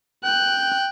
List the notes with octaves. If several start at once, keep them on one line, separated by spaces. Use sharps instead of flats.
G5 F#6